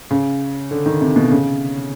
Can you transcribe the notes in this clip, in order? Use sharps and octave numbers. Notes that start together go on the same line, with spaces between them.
C#3
D3
D#3
C3
B2
C#3